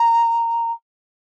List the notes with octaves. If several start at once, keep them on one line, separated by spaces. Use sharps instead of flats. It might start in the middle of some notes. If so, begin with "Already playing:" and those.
Already playing: A#5